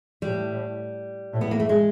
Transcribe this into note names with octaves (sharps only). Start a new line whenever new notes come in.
A2 G3
A2
B3
A#3
A3
G#3